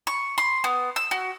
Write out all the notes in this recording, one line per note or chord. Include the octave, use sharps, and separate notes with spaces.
C#6
C6
B3
E6
F#4